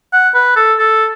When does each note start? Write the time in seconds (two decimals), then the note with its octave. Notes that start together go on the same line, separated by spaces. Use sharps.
0.13 F#5
0.34 B4
0.56 A4
0.79 A4